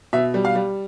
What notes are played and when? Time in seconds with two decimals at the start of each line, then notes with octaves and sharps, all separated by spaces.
0.13 B2 E5
0.34 G3
0.45 F5
0.55 G3